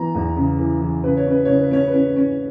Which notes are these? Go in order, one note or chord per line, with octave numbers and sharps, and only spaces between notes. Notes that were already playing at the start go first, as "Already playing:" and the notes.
Already playing: E3 B3 A#5
E2
C#3
E3
E3
C#3 B4
C#5
C#4 B4
C#3 C#5
B4
C#4 C#5
B4
C#4
C#4